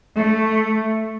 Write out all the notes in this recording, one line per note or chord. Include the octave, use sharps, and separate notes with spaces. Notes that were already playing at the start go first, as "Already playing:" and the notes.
A3